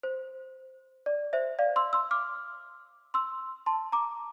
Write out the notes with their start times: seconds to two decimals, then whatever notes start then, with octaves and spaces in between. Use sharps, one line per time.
0.03 C5
1.06 D5
1.33 C5 E5
1.59 D5 F5
1.76 C6 E6
1.93 C6 E6
2.11 D6 F6
3.14 C6 E6
3.66 A5 C6
3.92 A#5 D6